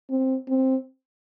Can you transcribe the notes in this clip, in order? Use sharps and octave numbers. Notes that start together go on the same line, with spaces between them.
C4
C4